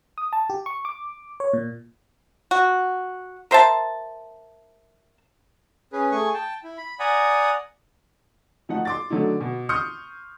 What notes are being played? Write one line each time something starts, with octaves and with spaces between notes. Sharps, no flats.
D#6
A5
G4
C#6
D6
C#5
A#2
F#4
A#4 C5 E5 A5
C#4 G#4 B4
A3 G#4 G#5 C#6
G5 A5
E4
B5
D5 F#5 G#5 A#5 D#6
F3 A3 D#4 A4 F#5
C6 D6 A6
D3 F#3 A3 D#4 E4
B2
C6 C#6 D#6 F6 G6 C#7